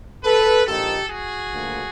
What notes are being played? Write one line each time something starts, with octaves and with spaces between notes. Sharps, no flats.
A4 B4
A#1 G#2 F3 A#3 D#4 G4 A4
F#4 G#4
D2 D3 F3 A#3